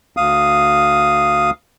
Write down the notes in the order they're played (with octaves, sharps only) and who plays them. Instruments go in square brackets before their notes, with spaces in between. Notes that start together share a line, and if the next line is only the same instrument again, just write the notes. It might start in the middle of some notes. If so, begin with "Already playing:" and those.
[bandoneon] D2 F5 D#6